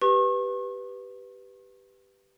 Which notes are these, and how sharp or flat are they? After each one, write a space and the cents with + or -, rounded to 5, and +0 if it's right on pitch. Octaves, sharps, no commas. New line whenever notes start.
G4 -5 B4 +0 C#6 -40